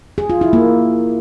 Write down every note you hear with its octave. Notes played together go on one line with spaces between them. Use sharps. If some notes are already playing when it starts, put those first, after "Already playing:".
G#4
F4
E4
A#3